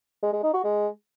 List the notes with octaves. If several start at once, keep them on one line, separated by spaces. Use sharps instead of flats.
G#3
G#3
D#4
F#4
G#3